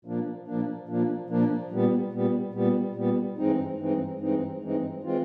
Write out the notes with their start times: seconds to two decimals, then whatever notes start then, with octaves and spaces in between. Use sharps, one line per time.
0.05 A#2 F3 A#3 D4
0.47 A#2 F3 A#3 D4
0.88 A#2 F3 A#3 D4
1.30 A#2 F3 A#3 D4
1.71 A#2 G3 B3
2.12 A#2 G3 B3
2.53 A#2 G3 B3
2.95 A#2 G3 B3
3.37 G2 E3 G#3 C4 D#4
3.79 G2 E3 G#3 C4 D#4
4.20 G2 E3 G#3 C4 D#4
4.61 G2 E3 G#3 C4 D#4
5.03 E3 G#3 C4 F4